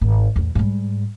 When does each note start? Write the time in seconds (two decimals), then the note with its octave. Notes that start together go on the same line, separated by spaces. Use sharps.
0.01 G#1
0.36 E2 A2
0.55 G#2 G3